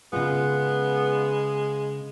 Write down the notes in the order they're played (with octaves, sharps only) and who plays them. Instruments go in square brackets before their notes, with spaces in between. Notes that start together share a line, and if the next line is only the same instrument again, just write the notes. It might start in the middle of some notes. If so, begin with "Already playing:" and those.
[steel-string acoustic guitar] C#3 F4 [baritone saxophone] G#3 [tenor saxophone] B3